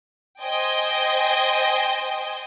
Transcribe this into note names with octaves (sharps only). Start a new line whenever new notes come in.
C5 D#5 G5 G#5